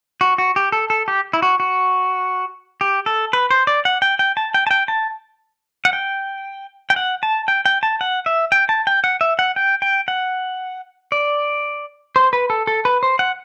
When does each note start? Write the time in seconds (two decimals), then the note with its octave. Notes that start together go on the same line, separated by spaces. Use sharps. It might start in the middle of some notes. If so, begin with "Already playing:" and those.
0.21 F#4
0.38 F#4
0.56 G4
0.72 A4
0.90 A4
1.08 G4
1.33 E4
1.42 F#4
1.60 F#4
2.81 G4
3.06 A4
3.33 B4
3.51 C5
3.67 D5
3.85 F#5
4.02 G5
4.19 G5
4.37 A5
4.54 G5
4.67 A5
4.71 G5
4.88 A5
5.85 F#5
5.93 G5
6.90 G5
6.96 F#5
7.23 A5
7.48 G5
7.66 G5
7.83 A5
8.01 F#5
8.26 E5
8.52 G5
8.69 A5
8.87 G5
9.04 F#5
9.21 E5
9.39 F#5
9.56 G5
9.82 G5
10.08 F#5
11.12 D5
12.16 C5
12.33 B4
12.50 A4
12.67 A4
12.85 B4
13.03 C5
13.19 F#5